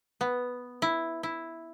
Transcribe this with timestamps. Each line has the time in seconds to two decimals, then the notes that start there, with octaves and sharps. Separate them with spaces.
0.21 B3
0.82 E4
1.23 E4